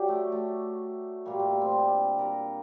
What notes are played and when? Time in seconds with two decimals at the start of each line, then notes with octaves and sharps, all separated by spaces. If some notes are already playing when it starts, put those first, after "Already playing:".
Already playing: F#3 G4 D5
0.08 A3
0.32 A3
1.25 A#2 G3 A#3
1.39 A3
1.51 A#3
1.61 C4
1.72 D4
2.19 A#4